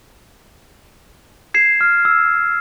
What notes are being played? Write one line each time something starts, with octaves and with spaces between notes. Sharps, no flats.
G#6 C7 E7
F6
E6